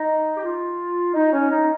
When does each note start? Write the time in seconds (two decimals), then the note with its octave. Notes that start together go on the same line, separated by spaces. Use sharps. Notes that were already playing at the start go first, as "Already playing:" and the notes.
Already playing: D#4
0.37 G4
0.44 F4
1.14 D#4
1.33 C#4
1.51 D#4